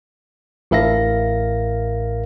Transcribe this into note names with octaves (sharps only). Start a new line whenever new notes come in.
A1 A2 A#4 E5 F5 A#6